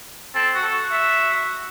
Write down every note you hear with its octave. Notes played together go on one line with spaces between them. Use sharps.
C4 A4
F#4
A4
F#4
E5